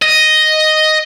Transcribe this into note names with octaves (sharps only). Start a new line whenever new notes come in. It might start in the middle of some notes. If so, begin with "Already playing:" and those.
D#5